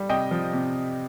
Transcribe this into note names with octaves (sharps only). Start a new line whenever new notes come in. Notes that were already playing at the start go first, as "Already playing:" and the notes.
Already playing: G3
C3 D#5 G5
F3
C3